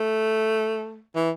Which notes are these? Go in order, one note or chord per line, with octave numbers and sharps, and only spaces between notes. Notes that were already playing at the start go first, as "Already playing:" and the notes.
Already playing: A3
E3